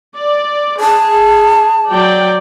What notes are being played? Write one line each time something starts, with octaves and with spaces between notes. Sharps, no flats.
D5
G#4 A5
F#3 D5 G5